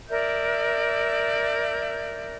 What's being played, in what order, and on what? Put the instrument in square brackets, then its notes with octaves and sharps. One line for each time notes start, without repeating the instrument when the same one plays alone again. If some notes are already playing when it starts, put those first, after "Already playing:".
[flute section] A#4 D5 E5 G6